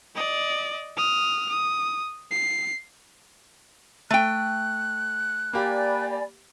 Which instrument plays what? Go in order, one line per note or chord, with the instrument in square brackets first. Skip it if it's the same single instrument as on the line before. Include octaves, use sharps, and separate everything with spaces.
[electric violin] D5 D#5
D#6 F6
D#6
C7
[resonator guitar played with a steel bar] A3 G5 [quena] F#6
[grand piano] A#3 G4 [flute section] D5 G#5 B5